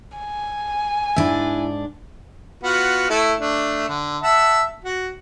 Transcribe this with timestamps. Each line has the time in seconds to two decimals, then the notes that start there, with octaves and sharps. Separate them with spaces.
0.18 G#5
1.16 G#2 D4 E4 E5
2.63 B3 F4 F#4
3.10 A3 E4 A4
3.40 A3 D4
3.89 D3
4.23 E5 F#5 A5
4.84 F#4